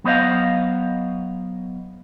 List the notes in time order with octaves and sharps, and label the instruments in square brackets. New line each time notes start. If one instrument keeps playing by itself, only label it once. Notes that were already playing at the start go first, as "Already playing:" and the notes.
[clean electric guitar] F#3 B3 C5 D#5 F5